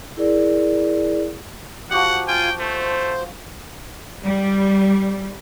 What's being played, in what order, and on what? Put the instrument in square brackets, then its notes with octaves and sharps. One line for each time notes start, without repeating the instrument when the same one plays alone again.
[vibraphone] E4 G#4 A#4 D5
[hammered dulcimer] F3 F#4 G4 [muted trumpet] F#5
[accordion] F4 G#5 [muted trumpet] G5
[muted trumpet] A3 [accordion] C5
[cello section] G3